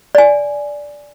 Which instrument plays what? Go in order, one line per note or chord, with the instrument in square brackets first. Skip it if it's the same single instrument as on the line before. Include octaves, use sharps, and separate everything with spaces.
[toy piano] D5 G#5